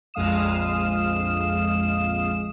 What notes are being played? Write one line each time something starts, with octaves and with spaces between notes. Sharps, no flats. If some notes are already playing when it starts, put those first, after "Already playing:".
A#1 F2 G#3 F5 D#6 E7